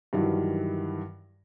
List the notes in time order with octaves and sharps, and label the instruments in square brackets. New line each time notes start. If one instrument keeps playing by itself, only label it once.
[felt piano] G2 D#3 E3 F#3